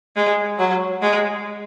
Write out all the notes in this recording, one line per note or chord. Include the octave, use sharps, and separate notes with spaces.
G#3
F#3
G#3